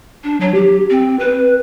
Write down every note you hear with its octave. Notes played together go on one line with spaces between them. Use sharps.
D4
F#3
G4
C4
B4